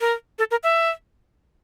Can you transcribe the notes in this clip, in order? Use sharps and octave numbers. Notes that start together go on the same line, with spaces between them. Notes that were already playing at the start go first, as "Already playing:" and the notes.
A#4
A4
A#4
E5